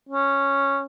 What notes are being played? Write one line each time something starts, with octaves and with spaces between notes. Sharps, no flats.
C#4